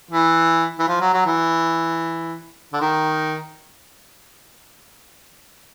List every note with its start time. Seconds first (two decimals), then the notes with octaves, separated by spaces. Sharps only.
0.11 E3
0.79 E3
0.88 F3
1.01 F#3
1.14 F#3
1.26 E3
2.73 D3
2.81 D#3